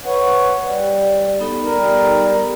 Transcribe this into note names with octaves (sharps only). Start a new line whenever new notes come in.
B4 C#5 F#5
G3
B3 D#4 A4
G3 A#4